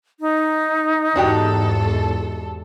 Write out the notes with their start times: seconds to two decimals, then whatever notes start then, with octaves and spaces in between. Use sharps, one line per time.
0.19 D#4
1.16 E2 G#2 D4 F#4 G4 A4